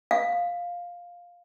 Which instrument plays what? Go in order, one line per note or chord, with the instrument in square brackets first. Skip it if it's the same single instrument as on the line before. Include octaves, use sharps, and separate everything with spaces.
[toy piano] F5